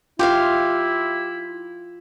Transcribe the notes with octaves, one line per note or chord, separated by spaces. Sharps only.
E4 F4 G4 E5 F5